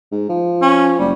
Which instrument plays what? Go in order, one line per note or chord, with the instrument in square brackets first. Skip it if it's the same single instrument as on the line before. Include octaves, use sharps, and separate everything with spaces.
[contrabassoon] G#2
F3
[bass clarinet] C#4
[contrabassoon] F#1 [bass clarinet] G3